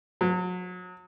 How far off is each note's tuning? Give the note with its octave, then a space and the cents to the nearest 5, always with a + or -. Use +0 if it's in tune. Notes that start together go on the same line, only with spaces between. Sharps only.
F#3 -35